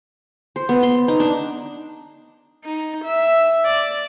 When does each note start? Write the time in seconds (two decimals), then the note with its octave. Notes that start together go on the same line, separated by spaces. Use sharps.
0.56 C5
0.69 B3
0.83 C6
1.08 D#4
1.20 D4
2.64 D#4
3.04 E5
3.66 D5